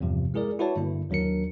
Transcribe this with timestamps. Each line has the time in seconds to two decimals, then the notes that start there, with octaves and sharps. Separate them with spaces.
0.01 E2 G2 C3 F3
0.34 G#3 E4 G#4 A#4 D5
0.59 E4 F#4 B4 C#5 D5 A5
0.76 G2 D3 A#3 E4
1.10 D#2 F#3 D4 A#4 C#7